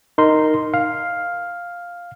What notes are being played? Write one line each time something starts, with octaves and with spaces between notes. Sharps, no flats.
D#4 A#4 C6
F5